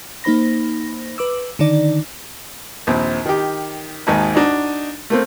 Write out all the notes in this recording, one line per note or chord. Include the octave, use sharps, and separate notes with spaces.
A#3 D#4 C5 B5 A#6
B4 D6 E6
D3 D#3 D#4 D5
A#1 D#2 C4
D#3 G4
G#1 D#2 G#2 D#3 G#5 A5
D4 D#4 F#4 D#5
A3 A#3 C4